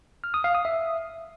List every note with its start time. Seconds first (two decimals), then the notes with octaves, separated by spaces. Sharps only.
0.24 F6
0.34 D#6
0.44 F5
0.55 D#6
0.65 E5